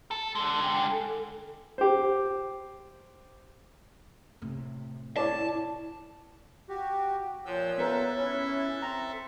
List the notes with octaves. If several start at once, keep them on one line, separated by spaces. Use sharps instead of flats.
A4
D3 G#3
G5 G#5
A4
G4 C5
A2 C3
E4 C#5 D5 A5
F#4 G4 G5
A#2 F3 C#5 E6 F#6 G6
B3 A4 A#4 E5
C#4 E4
C4 A#5